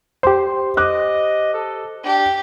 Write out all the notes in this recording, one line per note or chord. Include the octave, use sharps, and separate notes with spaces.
G4 C5 C6
D#5 D6 F#6
A4
D4 G4